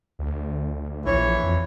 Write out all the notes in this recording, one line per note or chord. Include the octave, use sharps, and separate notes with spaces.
D2
A#1 E3 C#5
F2